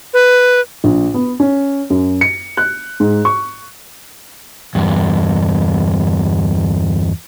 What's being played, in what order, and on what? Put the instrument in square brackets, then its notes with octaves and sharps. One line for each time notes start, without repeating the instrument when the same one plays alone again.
[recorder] B4
[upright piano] A#1
B3
C#4
F#2
C#7
F#6
G#2
C#6
[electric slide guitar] E2 G2